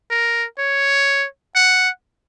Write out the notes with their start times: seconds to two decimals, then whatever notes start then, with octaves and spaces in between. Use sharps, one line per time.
0.11 A#4
0.59 C#5
1.55 F#5